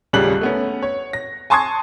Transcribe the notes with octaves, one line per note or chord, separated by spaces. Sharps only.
D#1 A1 C#3 G3 F#6 F#7
A3 B3 C#4
C#5
A#6
G#5 A5 C6 C#6 D#6 G#6